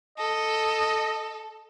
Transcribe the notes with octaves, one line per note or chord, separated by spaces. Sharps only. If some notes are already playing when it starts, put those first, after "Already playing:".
A4 D#5